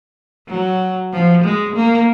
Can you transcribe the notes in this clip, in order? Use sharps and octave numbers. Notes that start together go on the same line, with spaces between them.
F#3
F3
G#3
A#3